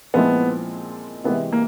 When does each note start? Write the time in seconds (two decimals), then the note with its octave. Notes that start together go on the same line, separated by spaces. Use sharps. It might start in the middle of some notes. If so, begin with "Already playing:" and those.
0.14 A#2 F3 G#3 B3 C4 E4
1.24 C3 E3 G#3 B3
1.52 A#3